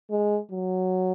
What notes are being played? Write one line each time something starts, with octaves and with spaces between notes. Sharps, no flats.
G#3
F#3